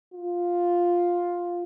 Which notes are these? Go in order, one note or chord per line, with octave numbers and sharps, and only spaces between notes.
F4